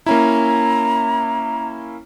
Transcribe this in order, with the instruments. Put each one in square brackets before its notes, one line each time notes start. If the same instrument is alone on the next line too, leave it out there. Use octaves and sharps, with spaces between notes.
[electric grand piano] A#3 C#4 E4 [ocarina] A#5